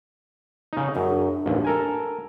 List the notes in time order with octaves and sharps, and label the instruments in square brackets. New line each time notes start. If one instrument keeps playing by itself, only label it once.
[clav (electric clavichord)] C#3 D#4
[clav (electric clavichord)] F#2 [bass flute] G#4
[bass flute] D4
[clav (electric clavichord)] A1 D#2
A4 A#4 G#5